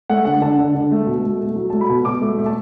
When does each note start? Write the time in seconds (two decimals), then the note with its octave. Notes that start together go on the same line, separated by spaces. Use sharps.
0.10 A3 F#5
0.25 D3 F#5
0.42 D3 A5
0.58 D3
0.75 D3
0.92 A3
1.07 B2
1.24 A3
1.40 A3
1.56 F#3
1.70 A3 A5
1.81 B5
1.89 B2
2.05 B2 D6
2.21 A3
2.38 A3
2.46 A5